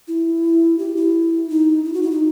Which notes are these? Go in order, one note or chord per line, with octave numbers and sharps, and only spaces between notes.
E4
G4
E4
D#4
E4
F#4
E4
D#4